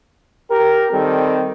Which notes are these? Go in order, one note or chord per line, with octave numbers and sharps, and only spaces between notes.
G4 A#4
D#3 G3 C4 A4